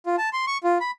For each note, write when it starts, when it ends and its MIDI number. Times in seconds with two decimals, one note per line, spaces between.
0.06 0.16 65
0.18 0.29 81
0.33 0.45 84
0.47 0.58 85
0.64 0.78 65
0.81 0.91 83